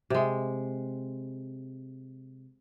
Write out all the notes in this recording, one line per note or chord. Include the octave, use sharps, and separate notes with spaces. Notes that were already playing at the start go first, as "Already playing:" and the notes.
C3 G#3